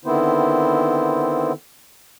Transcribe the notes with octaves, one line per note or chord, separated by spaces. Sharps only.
D3 D#3 B3 C4 E4 C5